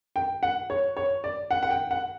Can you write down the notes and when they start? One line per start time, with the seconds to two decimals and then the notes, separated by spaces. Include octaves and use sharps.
0.16 G5
0.43 F#5
0.70 C#5
0.97 C#5
1.24 D5
1.51 F#5
1.63 F#5
1.70 G5
1.91 F#5